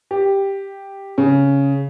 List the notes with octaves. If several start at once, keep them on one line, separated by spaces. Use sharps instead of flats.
G4
C#3